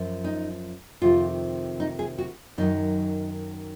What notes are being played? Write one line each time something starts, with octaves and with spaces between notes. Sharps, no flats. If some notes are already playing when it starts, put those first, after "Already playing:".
Already playing: F#2 F3
D#4
F2 C3 D#3 F4
D#4
G#4
F#4
F#2 D#3 F#3 D#4